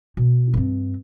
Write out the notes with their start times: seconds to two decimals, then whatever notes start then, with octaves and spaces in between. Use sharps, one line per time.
0.17 B2
0.54 G2 C4